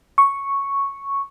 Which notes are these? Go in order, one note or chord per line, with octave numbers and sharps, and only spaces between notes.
C#6